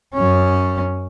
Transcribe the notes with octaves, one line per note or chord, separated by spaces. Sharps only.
F#2 C#4